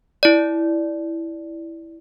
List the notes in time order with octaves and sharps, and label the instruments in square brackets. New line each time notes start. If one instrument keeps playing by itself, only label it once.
[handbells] E4 D5